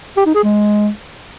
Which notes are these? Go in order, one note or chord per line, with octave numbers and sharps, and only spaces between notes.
G4
D#4
G#4
G#3